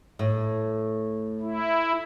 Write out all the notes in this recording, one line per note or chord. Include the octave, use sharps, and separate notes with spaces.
A2
E4